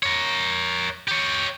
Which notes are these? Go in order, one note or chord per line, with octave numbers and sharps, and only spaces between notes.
A#4 C#5
G4 C#5